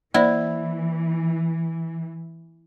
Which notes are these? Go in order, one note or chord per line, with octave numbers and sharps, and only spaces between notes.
E3 A#3 E4 C5 D5